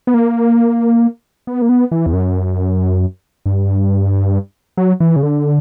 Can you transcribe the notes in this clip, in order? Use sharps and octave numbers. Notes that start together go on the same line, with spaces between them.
B3
A#3
B3
A#3
B3
E3
E2
F#2
G2
F#3
E3
C#3
D3